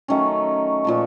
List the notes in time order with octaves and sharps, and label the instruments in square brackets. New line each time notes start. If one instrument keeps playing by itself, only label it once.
[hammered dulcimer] D#3 F#3 A3 C#4
A#2 F3 A3